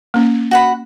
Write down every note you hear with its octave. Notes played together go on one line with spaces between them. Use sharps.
A#3 C#4
F#4 F#5 B5